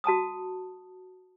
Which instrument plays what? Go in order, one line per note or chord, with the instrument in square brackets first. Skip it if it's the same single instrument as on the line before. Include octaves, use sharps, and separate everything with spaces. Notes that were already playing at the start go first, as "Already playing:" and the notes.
[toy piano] F#4 A5 A#5 D#6